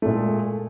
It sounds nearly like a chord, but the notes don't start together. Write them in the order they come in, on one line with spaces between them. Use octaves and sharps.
A3 A#2 G#3